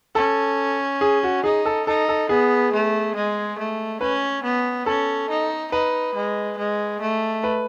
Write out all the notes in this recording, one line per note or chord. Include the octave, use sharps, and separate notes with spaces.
C#4 A4
G#4
F#4
D#4 G#4
A4
D#4 A4
A4
B3 G#4
A3
G#3
A3
C#4 B4
B3
C#4 A4
D#4
D#4 B4
G#3
G#3
A3
B4